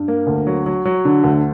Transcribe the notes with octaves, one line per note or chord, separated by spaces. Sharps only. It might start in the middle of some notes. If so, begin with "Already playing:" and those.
Already playing: G2
A#3
D2
F#3
F#3
F#3
D3
D2